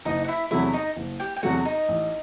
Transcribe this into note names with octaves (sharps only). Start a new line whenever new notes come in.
F#1 D#4 D#5
F#5
E4 E5
E2 C3 F#3 A3 E4 E5
D#4 D#5
F#1
G4 G5
G5
E2 C3 F#3 A3 F#4 F#5
D#4 D#5
A1